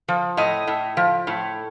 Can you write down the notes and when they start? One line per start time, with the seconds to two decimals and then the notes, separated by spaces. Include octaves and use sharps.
0.08 F3
0.37 A2 D#5
0.67 A2
0.97 F3
1.27 A2